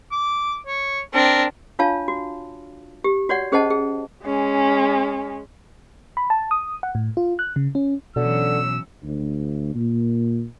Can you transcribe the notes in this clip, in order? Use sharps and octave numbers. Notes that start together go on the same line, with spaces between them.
D6
C#5
C4 D4 A#4
D4 F4 C#5 F5 A5
F#4
G4
F#4 C#5 D5 F#5
C#4 G#4 C5 D#5 F#5 A5
G#4
G#3 C#4
B5
A5
D#6
F#5
A2
F4
F#6
C#3
C#4
B2 D3 E3 F#3 C#4 E6
D2
A#2